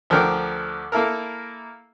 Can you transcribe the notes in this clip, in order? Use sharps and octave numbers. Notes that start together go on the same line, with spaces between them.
D2 F3 D4 A#4 G5
A#3 E4 A4 A#4